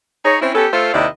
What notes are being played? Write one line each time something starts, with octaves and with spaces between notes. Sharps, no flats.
D#4 G#4 C#5
C4 C#4 E4
B3 C#4 G4 A4
A3 F4 A4 C5 E5 F5
D#2 C3 D#3 E4 D5 D#5